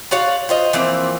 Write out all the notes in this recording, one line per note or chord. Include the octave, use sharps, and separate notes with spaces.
F4 F#4 C#5 F5
F4 C5 D#5
E3 F3 A#3 C4